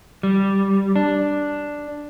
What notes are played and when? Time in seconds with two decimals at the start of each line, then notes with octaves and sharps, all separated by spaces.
0.23 G3
0.96 D4